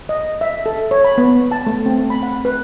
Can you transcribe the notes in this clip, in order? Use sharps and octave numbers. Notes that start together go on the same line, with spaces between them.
D#5
E5
A4
C#5
B5
B3
A5
A3
C4
B5
F#5
B4